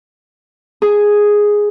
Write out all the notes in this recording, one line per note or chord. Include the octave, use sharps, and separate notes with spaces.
G#4